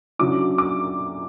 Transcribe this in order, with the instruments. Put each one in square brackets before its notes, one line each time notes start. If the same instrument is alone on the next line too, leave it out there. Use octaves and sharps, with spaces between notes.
[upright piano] D3 F#3 C#4 E4 D6
D6